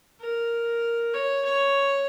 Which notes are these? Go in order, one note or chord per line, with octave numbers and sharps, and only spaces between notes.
A#4
C#5
C#5